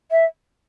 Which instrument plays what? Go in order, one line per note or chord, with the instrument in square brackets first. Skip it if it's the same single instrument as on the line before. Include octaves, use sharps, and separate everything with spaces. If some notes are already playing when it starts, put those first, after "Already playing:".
[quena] E5